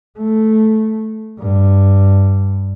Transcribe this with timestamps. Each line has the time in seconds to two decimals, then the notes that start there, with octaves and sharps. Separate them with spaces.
0.18 A3
1.40 G2